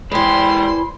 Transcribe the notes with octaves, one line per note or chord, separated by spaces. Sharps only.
E2 E3 G#3 G4 C5 B5 C6